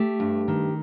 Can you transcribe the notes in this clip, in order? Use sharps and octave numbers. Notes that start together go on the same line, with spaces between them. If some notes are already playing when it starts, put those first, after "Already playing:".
Already playing: A3 G4
G2
D#3